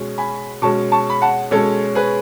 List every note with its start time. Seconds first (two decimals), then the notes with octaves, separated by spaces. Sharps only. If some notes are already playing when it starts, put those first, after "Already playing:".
Already playing: B2 G#3 C#4
0.18 G#5 B5
0.62 B2 G#3 C#4 A5 C#6
0.92 A5 C#6
1.10 B5
1.22 F#5 A5
1.51 B2 G#3 C#4 A4 C#5
1.95 G#4 B4